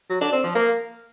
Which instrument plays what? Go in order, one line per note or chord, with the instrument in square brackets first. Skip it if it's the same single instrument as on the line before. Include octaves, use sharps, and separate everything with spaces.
[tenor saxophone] F#3
D4
C4
F3
A#3